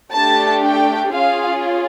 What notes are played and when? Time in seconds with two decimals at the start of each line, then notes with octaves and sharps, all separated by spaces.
0.13 A3 D4 G4 A5
0.63 G5
1.12 C#4 F4 G#4 F5